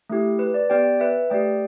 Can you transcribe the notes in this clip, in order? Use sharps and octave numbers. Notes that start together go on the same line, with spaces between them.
A3 E4 G4
B4
D5
B3 G4 D5 G5
B4 E5
A3 G4 D5 G5